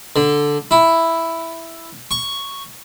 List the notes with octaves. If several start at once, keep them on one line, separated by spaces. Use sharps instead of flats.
D3
E4
C#6